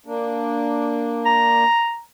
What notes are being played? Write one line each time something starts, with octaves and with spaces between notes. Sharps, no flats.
A#3 D4
A#5